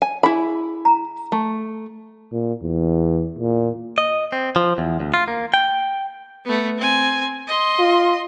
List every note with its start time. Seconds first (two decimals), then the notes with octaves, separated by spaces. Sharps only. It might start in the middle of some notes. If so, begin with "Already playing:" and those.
0.02 G#5
0.23 E4 G#4 G#5 B5
0.85 A#5
1.32 A3
2.32 A#2
2.62 E2
3.39 A#2
3.98 D#5
4.32 C4
4.56 F3
4.78 E2
5.00 D2
5.14 F4
5.28 A#3
5.54 G5
6.45 A3 B3
6.78 C4 G#5
7.47 D#5 C6
7.79 F4